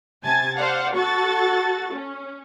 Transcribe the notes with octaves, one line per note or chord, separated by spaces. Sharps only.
C3 G#5 A5 G#6 A6
C5 D5 F5 F#5
F#4 A4 C#6 A6
C#4